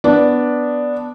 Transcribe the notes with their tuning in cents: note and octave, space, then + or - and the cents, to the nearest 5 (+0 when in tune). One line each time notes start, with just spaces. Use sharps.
B3 +0 D4 +0